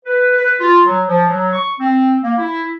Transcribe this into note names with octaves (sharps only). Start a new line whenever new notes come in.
B4
B4
F4
F#3
F3
F#3
C#6
C4
A#3
E4